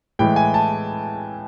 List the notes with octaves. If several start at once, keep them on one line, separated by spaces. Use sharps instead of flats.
A2 E3 G#3 G5
G#5
A5